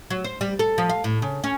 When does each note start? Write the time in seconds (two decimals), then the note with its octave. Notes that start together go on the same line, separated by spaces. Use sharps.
0.10 F#3
0.24 C5
0.41 G3
0.59 A4
0.78 F3
0.89 F5
1.04 A2
1.22 C#3
1.44 C#4